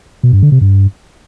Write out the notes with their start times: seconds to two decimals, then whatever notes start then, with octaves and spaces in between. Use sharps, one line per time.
0.23 B2
0.33 G2
0.42 D3
0.52 C3
0.61 G2